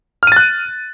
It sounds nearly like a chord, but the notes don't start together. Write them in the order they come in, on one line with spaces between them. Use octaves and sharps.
F6 D#7 A6 F#6